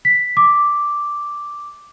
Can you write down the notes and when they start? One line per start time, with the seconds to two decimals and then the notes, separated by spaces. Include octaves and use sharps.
0.05 B6
0.37 D6